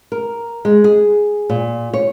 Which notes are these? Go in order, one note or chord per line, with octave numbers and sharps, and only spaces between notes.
A#4
G#3
G#4
A#2
C#5